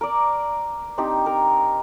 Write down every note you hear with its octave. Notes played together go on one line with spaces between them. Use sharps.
A#4 D5
C4 D4 D#4 G4
A#4